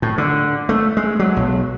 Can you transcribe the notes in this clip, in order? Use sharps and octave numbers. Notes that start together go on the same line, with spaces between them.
A2
D3
A3
G#3
F#3
B1